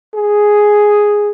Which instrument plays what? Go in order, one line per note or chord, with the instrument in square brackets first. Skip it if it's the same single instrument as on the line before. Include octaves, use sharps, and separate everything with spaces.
[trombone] G#4